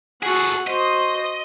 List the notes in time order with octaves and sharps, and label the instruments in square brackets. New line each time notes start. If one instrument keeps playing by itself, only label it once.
[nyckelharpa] F#4 F#5 [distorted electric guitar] G#4 A4
[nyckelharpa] F#4 C5 [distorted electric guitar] D#5